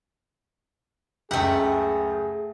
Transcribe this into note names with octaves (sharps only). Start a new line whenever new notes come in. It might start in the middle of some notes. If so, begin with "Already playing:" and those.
C#2 F#2 A3 G4 G#4 F#5